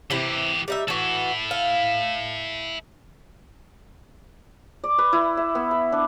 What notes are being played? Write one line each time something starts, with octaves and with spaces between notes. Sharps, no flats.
C3 E3 E4 G4
G3 D#4 E5
E3 E4 F#4 A4
F5
D5
B4
E4
E5
B3
B5
D4